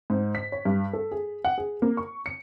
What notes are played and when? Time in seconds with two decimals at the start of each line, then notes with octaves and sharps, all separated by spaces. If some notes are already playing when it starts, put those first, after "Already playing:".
0.10 G#2
0.35 B6
0.52 C#5
0.65 G2
0.93 A4
1.11 G#4
1.45 F#5
1.58 G#4
1.82 A#3
1.97 C#6
2.26 C#7